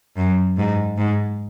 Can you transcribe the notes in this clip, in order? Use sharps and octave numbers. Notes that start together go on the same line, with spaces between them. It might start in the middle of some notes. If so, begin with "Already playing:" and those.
F#2
G#2
G#2